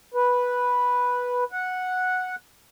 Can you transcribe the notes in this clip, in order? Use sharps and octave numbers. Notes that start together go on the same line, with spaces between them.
B4
F#5